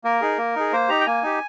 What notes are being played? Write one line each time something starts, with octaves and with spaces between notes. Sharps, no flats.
A#3 A#4
D#4 G#4
A#3
D#4 G#4
A#3 C5
D#4 G4 A#5
G5
A#3 G#5
D#4 G4